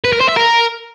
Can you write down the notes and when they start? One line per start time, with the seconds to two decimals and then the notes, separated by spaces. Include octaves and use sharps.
0.05 B4
0.13 A#4
0.21 C5
0.29 E5
0.37 A#4